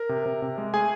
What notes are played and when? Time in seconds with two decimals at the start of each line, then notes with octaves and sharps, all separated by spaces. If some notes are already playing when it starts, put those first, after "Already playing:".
Already playing: A#4
0.09 C3
0.26 C3
0.42 C3
0.58 G#3
0.74 A3 G#4 G#5